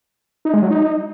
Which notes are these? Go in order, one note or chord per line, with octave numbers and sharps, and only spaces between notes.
D#4
G#3
F#3
D#4